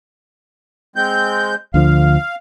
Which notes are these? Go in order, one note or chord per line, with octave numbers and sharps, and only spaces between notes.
G#3 C4 G6
D2 D3 F3 F5